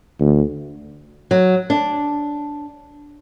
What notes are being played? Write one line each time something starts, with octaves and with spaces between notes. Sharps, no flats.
D2
F#3
D4